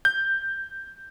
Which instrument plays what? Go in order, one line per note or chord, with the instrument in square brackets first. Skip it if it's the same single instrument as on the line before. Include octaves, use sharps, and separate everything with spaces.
[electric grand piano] G6